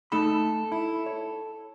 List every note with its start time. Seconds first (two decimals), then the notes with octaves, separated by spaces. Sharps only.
0.12 A3 D#4 A4 B5
0.72 E4
1.06 C#5